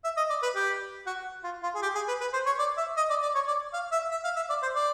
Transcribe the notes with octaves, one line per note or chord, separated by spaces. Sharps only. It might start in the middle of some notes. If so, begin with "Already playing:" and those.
E5
D#5
D5
B4
G4
F#4
F4
F4
G#4
G4
G#4
B4
B4
C5
C#5
D5
E5
D#5
D5
D5
C#5
D5
F5
E5
E5
F5
E5
D5
C5
D5